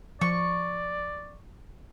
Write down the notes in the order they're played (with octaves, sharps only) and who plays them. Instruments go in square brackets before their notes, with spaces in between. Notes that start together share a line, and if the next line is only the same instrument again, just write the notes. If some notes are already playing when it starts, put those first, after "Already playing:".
[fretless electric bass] F3 [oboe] D5 [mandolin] C#6